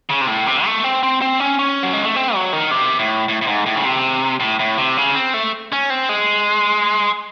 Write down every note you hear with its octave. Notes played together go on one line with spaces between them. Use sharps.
C#3
C3
A2
C3
A3
C4
C4
C4
C#4
C#4
F#3
G#3
A3
C4
F#3
D#3
C3
A2
A2
A2
G#2
A2
C#3
C3
A2
A2
C3
C#3
C4
A3
C#4
C4
G#3